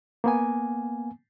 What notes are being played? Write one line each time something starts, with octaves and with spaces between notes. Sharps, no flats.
A#3 B3 G#5